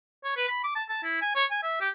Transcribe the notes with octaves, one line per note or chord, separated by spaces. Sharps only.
C#5
B4
B5
D6
A5
A5
E4
G#5
C#5
G#5
E5
G4